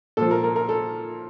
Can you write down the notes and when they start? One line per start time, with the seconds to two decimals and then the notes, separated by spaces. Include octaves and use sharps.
0.17 A#2 F3 A4
0.31 A#4
0.44 A#4
0.56 A#4
0.69 A4